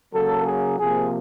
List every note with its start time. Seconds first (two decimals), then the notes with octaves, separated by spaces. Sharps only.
0.12 C#3 F#3 A#3 A4
0.45 G#4
0.77 C3 F3 A#3 G#4